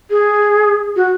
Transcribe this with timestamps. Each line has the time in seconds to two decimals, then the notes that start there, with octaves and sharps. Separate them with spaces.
0.11 G#4
0.96 F#4